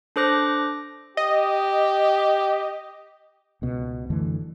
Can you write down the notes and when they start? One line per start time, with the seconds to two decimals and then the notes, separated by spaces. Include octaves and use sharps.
0.16 D4 A4 C5 D6 F#6 A#6
1.17 G4 D#5
3.62 C#2 B2
4.10 F#2 D3 E3 A3